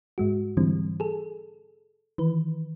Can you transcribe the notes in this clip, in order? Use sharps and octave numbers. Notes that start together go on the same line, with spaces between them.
G#2 G#3 F#4
G#2 D3 E3 G3 C4
G#4 A4
D#3 E3 B4